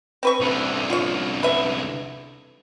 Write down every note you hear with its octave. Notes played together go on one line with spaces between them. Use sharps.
C4 B4 C#6
C2 D3
F4 C#5
B4 E5